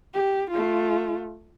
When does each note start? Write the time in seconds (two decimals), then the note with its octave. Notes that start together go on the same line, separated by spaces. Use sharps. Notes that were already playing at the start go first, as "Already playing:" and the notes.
0.14 G4
0.50 A3 F4